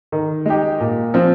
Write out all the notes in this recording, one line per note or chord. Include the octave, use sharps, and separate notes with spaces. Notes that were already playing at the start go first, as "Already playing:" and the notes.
D#3
G#3 D#4 G4
A#2
F3 C4